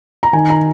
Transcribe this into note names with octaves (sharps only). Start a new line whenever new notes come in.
A#5
D#3 G#5
A#5